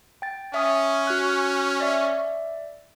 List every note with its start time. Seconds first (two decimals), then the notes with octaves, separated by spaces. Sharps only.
0.22 G5 A6
0.54 C#4 E5 D#6
1.07 F#4 F#6
1.80 D5 E5